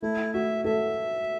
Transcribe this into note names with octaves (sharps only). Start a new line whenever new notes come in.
A3 E4
F#4 E5
A4 E5